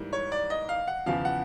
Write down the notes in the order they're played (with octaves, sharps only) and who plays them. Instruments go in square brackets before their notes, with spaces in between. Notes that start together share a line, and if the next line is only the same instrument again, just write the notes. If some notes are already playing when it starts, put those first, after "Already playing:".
Already playing: [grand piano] G#2 E3 G3 A#3
C#5
D5
D#5
F5
F#5
E2 C#3 F3 F5
F#5